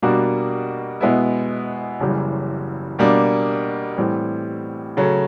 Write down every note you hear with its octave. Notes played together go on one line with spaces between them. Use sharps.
B2 G3 A#3 D4 F#4
B2 G#3 B3 E4
F#1 F#2 C#3 E3 G3
B2 G3 A#3 D4
A2 E3 G3 C4
C#3 F#3 A3